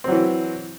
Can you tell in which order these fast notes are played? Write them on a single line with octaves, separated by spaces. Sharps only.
C4 F#3 E3